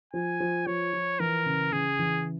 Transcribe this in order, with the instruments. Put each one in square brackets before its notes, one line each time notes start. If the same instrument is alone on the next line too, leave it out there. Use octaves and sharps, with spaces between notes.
[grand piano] F3 [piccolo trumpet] G#5
[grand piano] F3
[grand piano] F3 [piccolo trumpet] C#5
[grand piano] F3
[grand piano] E3 [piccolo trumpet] A#4
[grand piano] C#3
[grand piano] C#3 [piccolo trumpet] G#4
[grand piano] E3